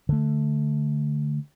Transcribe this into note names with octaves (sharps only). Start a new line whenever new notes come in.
D3 A3